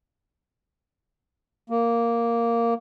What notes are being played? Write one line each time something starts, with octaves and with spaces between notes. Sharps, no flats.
A#3